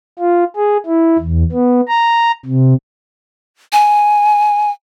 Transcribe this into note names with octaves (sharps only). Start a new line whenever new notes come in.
F4
G#4
E4
E2
B3
A#5
C3
G#5